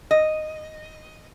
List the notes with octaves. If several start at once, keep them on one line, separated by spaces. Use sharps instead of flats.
D#5